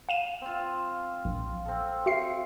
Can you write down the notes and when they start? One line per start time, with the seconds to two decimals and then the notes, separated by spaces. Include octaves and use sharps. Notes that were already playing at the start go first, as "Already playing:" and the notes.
0.09 F5 D#7 E7
0.41 C4 F4
1.25 A#1
1.65 C4 A4
2.06 F#4 E5 C7